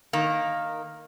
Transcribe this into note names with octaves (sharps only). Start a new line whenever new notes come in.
D#3 A#3